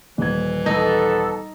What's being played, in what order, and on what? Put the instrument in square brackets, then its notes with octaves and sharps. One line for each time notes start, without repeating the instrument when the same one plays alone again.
[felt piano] D#1 G#6 [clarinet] E3
[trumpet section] B3 A4 [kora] D#4